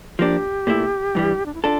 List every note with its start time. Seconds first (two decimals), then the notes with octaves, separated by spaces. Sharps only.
0.19 F3 A#3 D4 G4
0.67 A#2 A3 E4
1.15 G2 E3 G3
1.46 D4
1.54 E4
1.63 D4 F4 A4